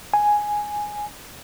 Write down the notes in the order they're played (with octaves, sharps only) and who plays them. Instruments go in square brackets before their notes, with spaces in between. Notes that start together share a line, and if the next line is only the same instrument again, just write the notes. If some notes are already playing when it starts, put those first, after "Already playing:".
[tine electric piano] G#5